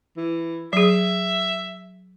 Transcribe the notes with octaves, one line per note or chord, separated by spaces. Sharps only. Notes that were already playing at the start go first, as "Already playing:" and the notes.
E3
F#3 G#4 E5